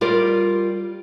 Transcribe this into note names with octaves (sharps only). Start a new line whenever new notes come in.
G3 F4 G4 A#4 D5